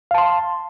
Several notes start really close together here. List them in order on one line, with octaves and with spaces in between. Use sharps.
F5 A5 C6